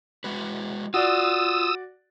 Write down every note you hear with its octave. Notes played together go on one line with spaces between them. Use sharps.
G#3 F#4 B4
F4 F#4 D5 D#6 E6